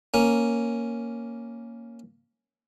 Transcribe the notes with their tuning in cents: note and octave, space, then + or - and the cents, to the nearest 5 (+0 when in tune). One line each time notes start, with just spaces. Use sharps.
A#3 +0 C#4 +0